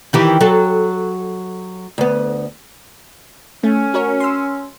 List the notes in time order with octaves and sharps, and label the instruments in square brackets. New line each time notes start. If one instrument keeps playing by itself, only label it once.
[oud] D#3 E3 G4
F#3 A4
D2 B3
[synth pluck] A3 [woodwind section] C#4
[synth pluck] F#4 A#4 C#5
C6 E6